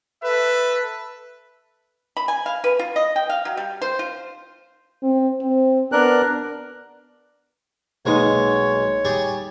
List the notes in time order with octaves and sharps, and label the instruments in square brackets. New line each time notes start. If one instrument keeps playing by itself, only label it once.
[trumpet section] A4 B4 E5
[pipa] B5
G#5
F5
B4
F4
D#5
G5
F5
F#3
G3
C5
F4
[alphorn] C4
C4
[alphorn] B3 [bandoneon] D4 A#4 F#6
[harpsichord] B1 B2 G#3 [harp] A#3 D#4 [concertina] C#5
[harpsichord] G3 G4 G#4 [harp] A6